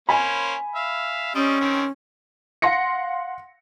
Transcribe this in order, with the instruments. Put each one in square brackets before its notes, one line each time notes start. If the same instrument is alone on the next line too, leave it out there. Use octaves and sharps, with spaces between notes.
[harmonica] A#3 C#4 C5 [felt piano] G#5 B5
[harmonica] E5 F5
[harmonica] G3 C4 D#5 [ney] C#4
[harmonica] D#3 C4
[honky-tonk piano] F5 F#5 C6 A#6 C#7